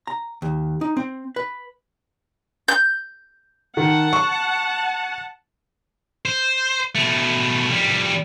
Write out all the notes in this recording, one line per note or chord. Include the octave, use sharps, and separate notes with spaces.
A#5
D#2
D#4
C4
B4
G6
D#3 F#5 A5
C#6
C5
B2 A3
F2 G3